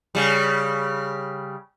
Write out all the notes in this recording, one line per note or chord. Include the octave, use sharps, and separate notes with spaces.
C#3 G3